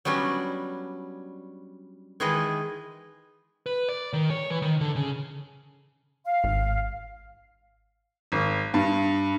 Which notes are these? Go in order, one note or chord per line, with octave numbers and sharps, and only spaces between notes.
F#3 G3 B3 C#4 D4
D#3 E3 G#3 G#4 B4 D#5
B4
D5
D#3
C#5
E3
D#3
D3
C#3
F5
G#1
G#1
G2